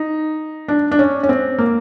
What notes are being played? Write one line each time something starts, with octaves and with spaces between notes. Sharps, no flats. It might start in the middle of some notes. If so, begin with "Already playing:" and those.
Already playing: D#4
D4
D4
C#4
C#4
C4
A#3